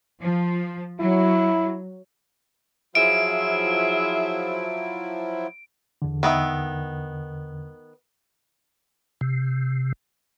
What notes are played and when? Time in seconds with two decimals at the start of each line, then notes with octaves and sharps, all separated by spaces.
0.21 F3
1.00 F#3 E4
2.95 F3 F#3 E4 F4 G#4 E5 D7
6.02 E2 D3
6.23 D#3 B3 E5
9.21 C3